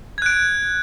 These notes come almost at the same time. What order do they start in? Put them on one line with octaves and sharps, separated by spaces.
G#6 F#6 D7